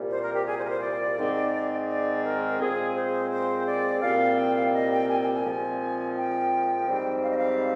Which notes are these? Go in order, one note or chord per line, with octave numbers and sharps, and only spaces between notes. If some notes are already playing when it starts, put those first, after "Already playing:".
Already playing: C2 A#2 G3
C5
A#4
G4
G#4
C5
A#4
C5
D5
G#2 D#3 G#3 C4
D5
A#4
A#2 G#3 C4 G#4
C5
C5
D5
C2 A#2 G3 C4 F5
G5
F5
D#5
G5
G#5
G5
G#5
A#2 F3 G#3 C4
G5
G#2 G3 C4
F5
D#5
F5